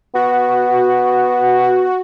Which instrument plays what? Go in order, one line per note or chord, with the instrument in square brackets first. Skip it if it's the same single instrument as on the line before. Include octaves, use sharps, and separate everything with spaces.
[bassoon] B3 [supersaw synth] F#4